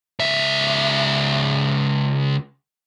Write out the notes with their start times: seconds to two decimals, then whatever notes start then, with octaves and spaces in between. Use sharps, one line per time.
0.20 C#2 E5